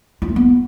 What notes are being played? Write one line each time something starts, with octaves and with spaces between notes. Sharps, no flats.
F4
A3
B3